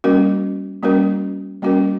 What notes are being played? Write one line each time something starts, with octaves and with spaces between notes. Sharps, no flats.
G3 A#3 C#4 F#4 A#4
G3 A#3 C#4 F#4 A#4
G3 A#3 C#4 F#4 A#4